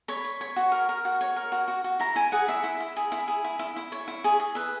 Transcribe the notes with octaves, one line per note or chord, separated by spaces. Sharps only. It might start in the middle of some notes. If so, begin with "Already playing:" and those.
C#5 B5
C#5
C#5
F#4
A#4
A#4
F#4
C#5
A#4
F#4
F#4
F#4
E4 A#5
E4 G#5
G#4 F#5
E4 E5
E4
E4
G#4
E4
G#4
E4
E4
E4
C#5
E4
G#4
G#4
B4 E5